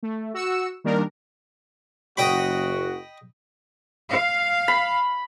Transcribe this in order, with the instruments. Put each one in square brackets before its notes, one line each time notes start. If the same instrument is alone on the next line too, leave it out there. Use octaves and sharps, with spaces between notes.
[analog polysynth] A3
F#4 E6 C#7 E7
D#3 G3 A#3 D4 A#4
[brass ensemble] F#1 F#4 [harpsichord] D#5 G5 B5
[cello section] F5
[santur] B5